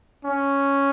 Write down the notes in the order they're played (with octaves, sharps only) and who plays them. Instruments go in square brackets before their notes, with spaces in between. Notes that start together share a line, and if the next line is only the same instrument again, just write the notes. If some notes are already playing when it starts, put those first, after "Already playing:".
[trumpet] C#4